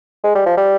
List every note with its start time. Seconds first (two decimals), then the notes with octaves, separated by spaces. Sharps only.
0.24 G#3
0.35 G3
0.46 F3
0.57 G3